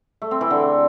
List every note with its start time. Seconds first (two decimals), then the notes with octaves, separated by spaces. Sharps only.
0.22 A3
0.31 C4
0.41 E3
0.50 D3